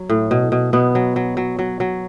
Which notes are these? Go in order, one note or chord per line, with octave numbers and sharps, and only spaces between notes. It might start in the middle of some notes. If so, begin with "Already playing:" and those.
Already playing: F#3
A2
B2
B2
B2 B3
F#3
F#3
F#3
F#3
F#3